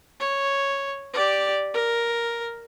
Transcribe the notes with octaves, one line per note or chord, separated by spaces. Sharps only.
C#5
G4 D5
A#4